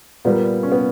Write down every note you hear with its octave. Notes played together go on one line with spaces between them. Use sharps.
A#2 G3 A#3 B3
C#4
B3